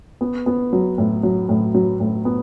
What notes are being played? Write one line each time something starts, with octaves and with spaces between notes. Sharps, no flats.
B3
B3
F#3
A2
F#3
A2
F#3
A2
B3